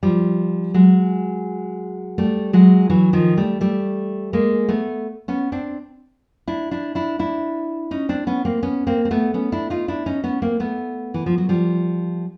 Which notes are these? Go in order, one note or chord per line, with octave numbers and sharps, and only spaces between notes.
F3 G3
F#3 G#3
G3 A3
F#3 G#3
E3 F#3
D#3 F3
G3 A3
G3 A3
G#3 A#3
A3 B3
B3 C#4
C4 D4
D4 E4
D4 E4
D4 E4
D4 E4
C#4 D#4
C4 D4
B3 C#4
A#3 C4
B3 C#4
A#3 C4
C4
A3 B3
B3 C#4
D4 E4
D#4 F4
D4 E4
C#4 D#4
B3 C#4
A#3 C4
A3 B3
E3
F3
F#3
F3 G3